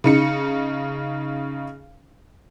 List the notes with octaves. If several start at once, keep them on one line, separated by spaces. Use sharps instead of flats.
C#3 D#4 C#7